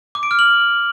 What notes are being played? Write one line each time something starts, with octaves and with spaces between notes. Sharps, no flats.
D6
D7
F6
F#7